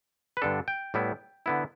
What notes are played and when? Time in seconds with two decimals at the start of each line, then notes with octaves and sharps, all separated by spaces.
0.37 B4
0.42 G2 D3 B3 D4 A4
0.68 G5
0.94 A2 G3 B3 E4
1.46 D3 B3 E4